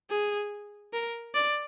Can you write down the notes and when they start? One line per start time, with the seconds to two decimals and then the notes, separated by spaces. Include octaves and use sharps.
0.10 G#4
0.93 A#4
1.34 D5